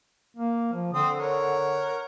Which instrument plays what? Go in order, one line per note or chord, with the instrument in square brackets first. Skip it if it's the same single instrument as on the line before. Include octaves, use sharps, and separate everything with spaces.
[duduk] A#3
F3
[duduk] D3 [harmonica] C4 D#6
[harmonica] A#4 C#5 F#5